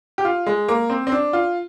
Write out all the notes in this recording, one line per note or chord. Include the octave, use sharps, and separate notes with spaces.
G4
F4
G#3
A#3
C4
C4
D4
F4